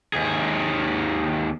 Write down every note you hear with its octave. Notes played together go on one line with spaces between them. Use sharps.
D#2 G#4